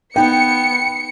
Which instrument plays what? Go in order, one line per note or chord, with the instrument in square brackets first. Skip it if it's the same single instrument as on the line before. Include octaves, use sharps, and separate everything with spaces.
[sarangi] B3 [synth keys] D#4 B5 [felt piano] G5 [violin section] C#7